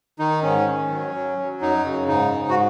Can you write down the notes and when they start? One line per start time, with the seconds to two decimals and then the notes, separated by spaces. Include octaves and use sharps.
0.19 D#3 D#4
0.43 G#2 C#4
0.67 D#3
0.90 F#3
1.14 F#3
1.38 F#3
1.62 F#2 D#4
1.85 C#3
2.08 G#2 D#4
2.32 G#2
2.49 F#4